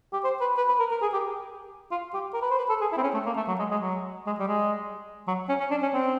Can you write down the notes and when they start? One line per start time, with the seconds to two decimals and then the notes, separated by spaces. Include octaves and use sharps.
0.13 G4
0.24 C5
0.41 B4
0.57 B4
0.69 B4
0.79 A#4
0.91 A#4
1.02 G#4
1.13 G4
1.91 F4
2.14 G4
2.33 A#4
2.42 B4
2.50 C5
2.58 B4
2.69 A4
2.81 G#4
2.92 E4
2.97 C4
3.03 C#4
3.14 A3
3.26 A#3
3.36 A3
3.48 F#3
3.59 G#3
3.71 G#3
3.81 F#3
4.26 G#3
4.39 G3
4.48 G#3
5.27 F#3
5.49 C#4
5.60 C#4
5.71 D4
5.82 C#4
5.94 C4